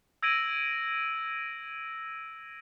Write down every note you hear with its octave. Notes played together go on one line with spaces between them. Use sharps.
E6 G#6 A#6 D7 D#7 F#7